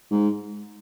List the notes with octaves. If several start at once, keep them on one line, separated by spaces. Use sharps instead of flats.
G#2